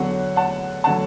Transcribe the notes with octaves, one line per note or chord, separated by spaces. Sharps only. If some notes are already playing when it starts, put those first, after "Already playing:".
Already playing: E2 D3 F#3 F#5
F#5 A5
D3 F#3 F#5 A5